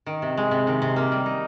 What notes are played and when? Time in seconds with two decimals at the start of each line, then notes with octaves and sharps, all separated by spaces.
0.06 D#3
0.22 C3
0.37 G#3
0.51 C3
0.67 D#3
0.82 C3
0.96 A#3
1.12 G3
1.26 D#4